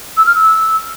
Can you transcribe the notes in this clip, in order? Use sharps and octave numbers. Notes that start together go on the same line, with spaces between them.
E6
F6
E6